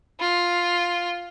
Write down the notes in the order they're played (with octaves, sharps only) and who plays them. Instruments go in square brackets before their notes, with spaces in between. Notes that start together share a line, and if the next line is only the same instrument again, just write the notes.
[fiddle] F4